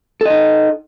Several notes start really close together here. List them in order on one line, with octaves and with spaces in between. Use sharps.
A4 D#5 D#4